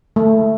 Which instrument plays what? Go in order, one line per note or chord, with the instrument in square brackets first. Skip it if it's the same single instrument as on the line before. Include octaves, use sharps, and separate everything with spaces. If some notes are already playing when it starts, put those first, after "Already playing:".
[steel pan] A3